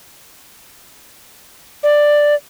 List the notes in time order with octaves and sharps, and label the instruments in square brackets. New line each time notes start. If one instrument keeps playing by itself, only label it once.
[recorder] D5